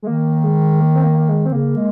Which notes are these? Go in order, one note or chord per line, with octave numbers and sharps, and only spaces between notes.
G#3
D#3 A#3
G#3
A#3
C4
A#3
A#3
G#3
C4
C#3 A#3
G#3